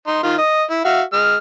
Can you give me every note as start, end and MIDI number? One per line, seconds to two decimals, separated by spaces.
0.07 0.23 63
0.07 0.23 84
0.23 0.37 51
0.23 0.37 65
0.38 0.63 75
0.70 0.83 64
0.85 1.02 66
0.85 1.02 76
0.85 1.02 77
1.13 1.36 56
1.13 1.36 89